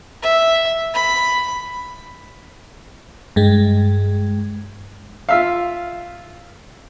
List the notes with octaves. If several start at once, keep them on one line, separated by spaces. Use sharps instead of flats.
E5
B5
G2 G#3
F4 E5 F5